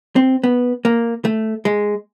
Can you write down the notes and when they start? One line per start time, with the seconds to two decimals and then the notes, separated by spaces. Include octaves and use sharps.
0.16 C4
0.44 B3
0.85 A#3
1.25 A3
1.65 G#3